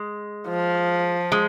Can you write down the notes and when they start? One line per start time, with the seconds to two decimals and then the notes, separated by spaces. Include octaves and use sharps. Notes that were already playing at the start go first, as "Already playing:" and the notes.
Already playing: G#3
0.48 F3
1.32 G#3